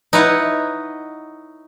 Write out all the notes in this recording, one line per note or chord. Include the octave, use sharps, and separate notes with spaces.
D#4 E4 B4 C#5 F#5